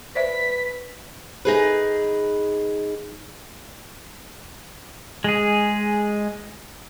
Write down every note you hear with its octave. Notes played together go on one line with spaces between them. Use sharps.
B4 C5 D5 E5 B6
D#4 G#4 B4
G#3 G#4